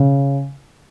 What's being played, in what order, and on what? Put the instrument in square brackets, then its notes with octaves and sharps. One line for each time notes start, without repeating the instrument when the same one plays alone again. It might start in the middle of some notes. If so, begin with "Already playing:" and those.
Already playing: [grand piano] C#3